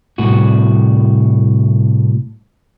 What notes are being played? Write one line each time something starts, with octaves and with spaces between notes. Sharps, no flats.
C2 A2 F#4